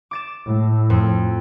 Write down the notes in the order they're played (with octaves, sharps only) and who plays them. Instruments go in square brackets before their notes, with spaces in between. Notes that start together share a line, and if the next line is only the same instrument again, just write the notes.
[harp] D6 A6 E7
[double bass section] A2
[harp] F2